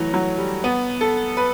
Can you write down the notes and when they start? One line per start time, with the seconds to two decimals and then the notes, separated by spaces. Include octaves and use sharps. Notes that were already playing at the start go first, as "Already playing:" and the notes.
Already playing: E3 F#3 A3
0.14 F#3
0.38 G3
0.64 B3
1.01 A4
1.37 B4